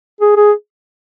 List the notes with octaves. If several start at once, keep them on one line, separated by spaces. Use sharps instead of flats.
G#4
G#4